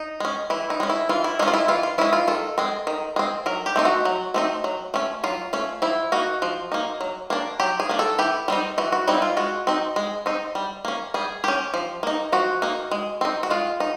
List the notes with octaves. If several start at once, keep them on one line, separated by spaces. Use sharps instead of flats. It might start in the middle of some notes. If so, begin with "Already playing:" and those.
Already playing: D#4
G#3 C#4
E3 E4
D#4
G#3 C#4
E4
E3 F4
E4
G#3 C#4 D#4 F4
E4
E3 F4
F4
G#3 C#4 E4
F4
D#3 A4
G#3 C4
D#3
G#3 C4
F#3 A#4
G4
A3 C4 D#4
F#4
F#3
A3 C4 D#4
F#3
A3 C#4
F#3 F4
A3 C#4
F3 E4
A#3 D#4 F#4
F3
A#3 D#4
F#3
A#3 D4
F#3 G4
G#4
A#3 D4
A4
E3 G4
G3 C4 D#4
E3 F#4
F#4
G3 C4 D#4 E4
F4
G#3 F#4
C4 D#4
G#3
C4 D#4
G3
A#3 C#4
G3 G#4
A#3 C#4 G4
F3
A#3 D#4
F3 F#4
A#3 D#4
G#3
C4 D#4
F#4
G#3 F4
D#4